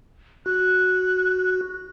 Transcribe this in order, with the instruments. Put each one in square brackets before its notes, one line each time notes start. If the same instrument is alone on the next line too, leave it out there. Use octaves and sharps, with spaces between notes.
[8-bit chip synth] F#4 [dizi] F#6